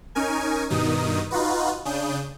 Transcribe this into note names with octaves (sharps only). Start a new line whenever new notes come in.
C#4 D#4 A#4 G#5
G2 B2 D#3 D#4 D#6
D#4 F4 F#4 B4
C#3 D4 D#6 G6